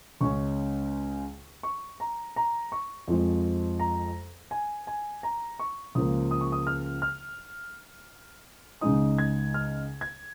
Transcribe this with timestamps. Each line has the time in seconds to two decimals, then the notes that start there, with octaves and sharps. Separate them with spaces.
0.21 C#2 C#3 G#3 C#4 C#6
1.63 C#6
2.00 A#5
2.36 A#5
2.72 C#6
3.08 F2 F3 G#3
3.80 A#5
4.51 G#5
4.87 G#5
5.23 A#5
5.60 C#6
5.95 C#2 C#3 F3 A#3 D#6
6.31 D#6
6.41 C#6
6.52 D#6
6.67 F6
7.02 F6
8.81 C#2 C#3 G#3 D#4 D#6
9.18 G#6
9.54 F6
10.01 G#6